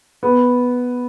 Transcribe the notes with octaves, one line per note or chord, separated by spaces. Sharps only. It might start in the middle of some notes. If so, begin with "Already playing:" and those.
B3